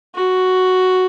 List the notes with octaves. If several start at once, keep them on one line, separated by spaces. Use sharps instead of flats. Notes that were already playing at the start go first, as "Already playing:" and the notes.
F#4